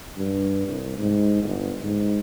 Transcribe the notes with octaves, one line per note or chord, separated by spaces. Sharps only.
G2
C2
G#2
G1
G#2